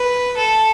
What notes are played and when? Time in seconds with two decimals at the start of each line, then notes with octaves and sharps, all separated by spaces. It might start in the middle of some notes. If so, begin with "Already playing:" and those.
Already playing: B4
0.38 A4